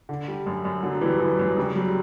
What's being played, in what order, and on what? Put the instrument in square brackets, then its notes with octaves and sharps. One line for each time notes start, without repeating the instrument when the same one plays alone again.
[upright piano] D3
G3
F#2
F#2
[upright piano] D3 [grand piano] F#3
[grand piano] E3 [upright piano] G3
[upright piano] F#2 [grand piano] E3
[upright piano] F#2 [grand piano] F#3
[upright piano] C#3 [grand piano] G3
[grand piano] F#3 [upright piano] G3